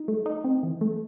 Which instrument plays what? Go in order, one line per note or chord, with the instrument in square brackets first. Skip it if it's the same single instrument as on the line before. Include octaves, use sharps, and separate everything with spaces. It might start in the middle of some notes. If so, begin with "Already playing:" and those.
Already playing: [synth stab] D#4
A3
D#4
C4
E3
A3